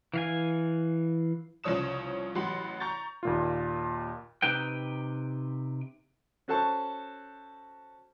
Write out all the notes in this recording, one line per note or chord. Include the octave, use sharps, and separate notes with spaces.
E3 F5 G#5
C2 C#3 F3 C#5 D#6 E7
A1 F#3 G4 F#5 B5 C6
A#5 C#6 G6 A6
D#2 A#2 F4
C3 D#4 B4 G5
C#4 F#4 A4 C5 A5 C#6